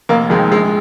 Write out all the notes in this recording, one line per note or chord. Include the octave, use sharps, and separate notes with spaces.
F1 A#3
F2 D#3 G#3
A#1 G#3